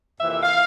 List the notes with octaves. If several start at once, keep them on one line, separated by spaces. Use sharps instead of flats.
F2 C3 E3 A#3 E5
E5
F5